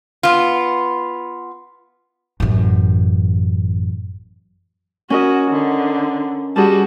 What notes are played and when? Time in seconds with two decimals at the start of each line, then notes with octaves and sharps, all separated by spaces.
0.23 B3 F4
2.40 A1 F#2
5.10 C#4 F#4 A#4 D#5
5.51 D3
6.56 G3 F#4 G#4 A5